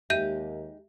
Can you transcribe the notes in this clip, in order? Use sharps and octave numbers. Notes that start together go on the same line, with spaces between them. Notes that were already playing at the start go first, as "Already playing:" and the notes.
D#2 G#3 D#4 G4 E5 G6 D#7